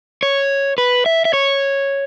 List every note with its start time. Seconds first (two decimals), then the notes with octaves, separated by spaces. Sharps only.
0.23 C#5
0.78 B4
1.06 E5
1.25 E5
1.33 C#5